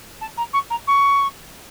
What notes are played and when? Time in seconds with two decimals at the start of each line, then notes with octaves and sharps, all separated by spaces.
0.21 A5
0.37 A#5
0.53 C#6
0.70 A#5
0.87 C#6